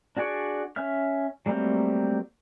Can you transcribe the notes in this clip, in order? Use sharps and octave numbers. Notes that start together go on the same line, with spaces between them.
D4 F#4 G#4 D5 C#6
C#4 E5 F6
F#3 G3 A3 A#3 C4